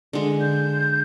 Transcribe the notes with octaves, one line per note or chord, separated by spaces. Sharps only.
D3 G#3
G6